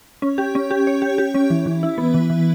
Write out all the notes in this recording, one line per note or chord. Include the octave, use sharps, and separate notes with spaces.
C#4
G4
C#4
G4
C#5
G4
G4
C#4
E3
E3
E4
B3
E3
E3